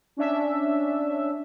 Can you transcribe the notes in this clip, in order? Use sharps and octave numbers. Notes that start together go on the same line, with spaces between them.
C#4 D4 E5